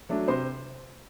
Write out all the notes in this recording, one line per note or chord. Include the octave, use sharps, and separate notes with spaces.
F#3 A3 D4
C3 C5 C6